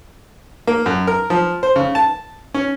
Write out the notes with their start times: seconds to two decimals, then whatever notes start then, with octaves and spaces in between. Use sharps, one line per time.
0.67 A#3
0.86 F#2
1.07 A#4
1.30 F3
1.63 C5
1.76 C#3
1.95 A5
2.54 C#4